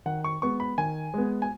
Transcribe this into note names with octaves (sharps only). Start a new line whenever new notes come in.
D#3 F#5
C#6
G#3 B3 C#6
B5
D#3 G#5
G#3 B3
G#5